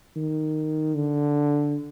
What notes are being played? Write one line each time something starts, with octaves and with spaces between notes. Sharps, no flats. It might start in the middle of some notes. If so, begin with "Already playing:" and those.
D#3
D3